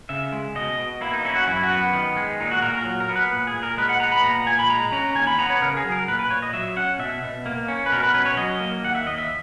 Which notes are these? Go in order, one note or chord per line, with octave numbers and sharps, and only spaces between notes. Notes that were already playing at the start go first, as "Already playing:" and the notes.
C#3 E5
G#3
B2 D#5
B2
A#3 E4
D#4
C#4 E4
F#4
F#2 E4
F#4
B3
D#3
G#3
A#2 D#4
F#4
A#2 A#4
A#4
F#3
A#4
B3
B4
A#2
G#4
A#2
A#4
G#3 B4
F#5
B3 A#5
B5
A#2 A#5
A#2 G#5
B5
G#3 A#5
C#4 A#5
D#2 G#5
B5
B3 A#5
C#5
C#3 A#4
G#4
F#3
A#4
A#2 B4
B4
A#2 C#5
D#5
F#3 E5
C#4 F#5
B2 E5
B2
A#3
C#4
B4
B2 A#4
B4
C#4 B4
C#5
F#3 D#5
A#3
D#2 F#5
E5
D#2 D#5
E5